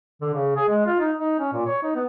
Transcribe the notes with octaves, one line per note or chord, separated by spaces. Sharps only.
D3
C#3
G#4
G#3
F4
D#4
D#4
C#4
A#2
C#5
D#4
B3